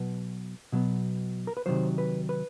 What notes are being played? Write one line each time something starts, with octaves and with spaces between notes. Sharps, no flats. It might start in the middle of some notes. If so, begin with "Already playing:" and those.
Already playing: B2 F#3 B3 B4
B2 F#3 B3
A#4
B4
C3 D#3 F#3 C5
B4
B4